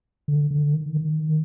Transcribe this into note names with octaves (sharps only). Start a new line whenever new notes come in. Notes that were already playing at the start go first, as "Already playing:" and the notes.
D3
D3
D#3
D#3